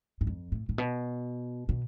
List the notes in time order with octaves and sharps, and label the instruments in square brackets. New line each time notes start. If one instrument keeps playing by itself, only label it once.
[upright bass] G#2
F2
A2
A2
B2
B2